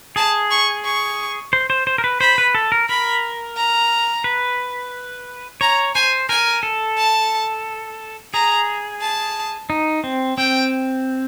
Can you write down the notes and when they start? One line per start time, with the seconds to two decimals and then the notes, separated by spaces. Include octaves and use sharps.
0.16 G#4 A5
0.51 C#6
0.85 C#6
1.53 C5
1.70 C5
1.87 C5
1.98 A#4
2.04 B4
2.21 C5 B5
2.38 B4
2.55 A4
2.72 A#4
2.89 A#4 B5
3.56 A#5
4.24 B4
5.61 C#5 A#5
5.95 C5 G#5
6.29 A#4 G#5
6.63 A4
6.97 A5
8.34 G#4 A#5
9.01 A5
9.70 D#4
10.04 C4
10.38 C4 G5